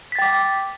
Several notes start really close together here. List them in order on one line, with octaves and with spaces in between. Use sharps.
B6 A6 G5 D6